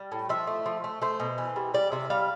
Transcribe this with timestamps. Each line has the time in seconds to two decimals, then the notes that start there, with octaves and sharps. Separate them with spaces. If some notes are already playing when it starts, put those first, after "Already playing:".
Already playing: G3
0.12 A2
0.29 F3 E5
0.47 A3
0.66 F3
0.84 A3
1.02 A3 C5
1.20 B2
1.38 E3
1.56 G3
1.74 G3 D5
1.92 C3 E5
2.10 G3 F5